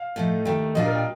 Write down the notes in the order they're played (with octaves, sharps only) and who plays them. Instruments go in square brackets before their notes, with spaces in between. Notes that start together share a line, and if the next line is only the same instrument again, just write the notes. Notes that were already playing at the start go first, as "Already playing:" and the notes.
Already playing: [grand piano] F5
[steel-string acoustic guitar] A2 F3 A3 D#4
[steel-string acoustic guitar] D#2 D#3 A3 [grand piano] G5
[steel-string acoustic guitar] A#2 G3 D4 F4 [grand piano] D#5
[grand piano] A#4
G5